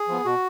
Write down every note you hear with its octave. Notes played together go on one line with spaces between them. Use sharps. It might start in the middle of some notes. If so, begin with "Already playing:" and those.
Already playing: G#4
F3 B3
B2 F#4